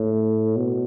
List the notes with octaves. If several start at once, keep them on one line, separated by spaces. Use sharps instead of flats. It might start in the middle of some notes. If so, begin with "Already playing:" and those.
Already playing: A2
B2